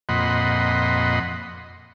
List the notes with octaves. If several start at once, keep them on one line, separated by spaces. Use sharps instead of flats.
F2 A#2 D#5 F#5 B5 C6